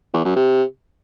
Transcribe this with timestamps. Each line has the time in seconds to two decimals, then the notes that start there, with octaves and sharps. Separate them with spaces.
0.14 E2
0.25 F#2
0.36 C3